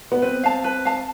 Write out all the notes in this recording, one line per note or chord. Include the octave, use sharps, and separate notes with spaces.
B3
C4 B4
F5 A5
B4
F5 A5